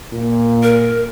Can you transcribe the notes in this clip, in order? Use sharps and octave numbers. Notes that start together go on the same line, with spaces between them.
A#2
A#4